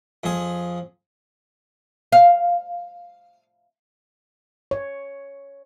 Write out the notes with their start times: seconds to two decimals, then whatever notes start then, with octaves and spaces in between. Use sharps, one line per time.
0.24 F2 G#4
2.12 F5
4.71 C#5